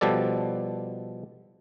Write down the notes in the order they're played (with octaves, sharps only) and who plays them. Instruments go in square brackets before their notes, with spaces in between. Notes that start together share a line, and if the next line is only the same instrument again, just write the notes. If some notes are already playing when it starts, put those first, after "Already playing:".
[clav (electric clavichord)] B2 F3 G3 A4 D5